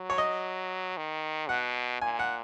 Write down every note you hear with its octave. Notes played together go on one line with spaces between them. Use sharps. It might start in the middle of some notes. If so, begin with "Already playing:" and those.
Already playing: F#3
C#5
D#5
D#3
B2 F#5
A#2 G#5
F#5